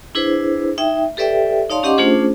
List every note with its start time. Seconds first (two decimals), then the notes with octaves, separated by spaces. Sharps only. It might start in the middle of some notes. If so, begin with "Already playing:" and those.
0.15 D4 E4 G#4 B4 C5
0.78 D#4 E5 G5
1.17 G4 A4 B4 D5 E5 G5
1.70 D#4 C#5 D5 F5 A5 C6
1.83 C#4 G4 D#5 F#5 C6 D6
1.98 A3 C#4 D4 F4 G#4 C5